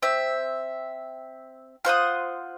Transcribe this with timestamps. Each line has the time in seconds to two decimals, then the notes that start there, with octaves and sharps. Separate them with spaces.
0.03 C4 E5
1.85 F4 C5 F#5 D#6